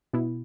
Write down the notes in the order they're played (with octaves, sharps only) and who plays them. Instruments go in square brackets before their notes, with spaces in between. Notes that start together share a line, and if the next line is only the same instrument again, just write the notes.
[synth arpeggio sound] B2 B3 E4